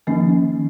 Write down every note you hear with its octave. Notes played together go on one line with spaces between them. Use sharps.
D#3 F3 A#3 C#4